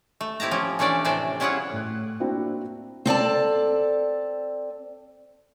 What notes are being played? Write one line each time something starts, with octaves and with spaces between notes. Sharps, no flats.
A3
C4 E4 G4 A5 A#5
F3 C#4 G4
E3 A3 C#4 D4 D5
A2 C3 C5 D5 E5 G#5
G3 C#4 E4 F4 G#4 F#5
A2 F#6
A#3 C4 D4 E4 F#4 G5
C4 A4 D5 A5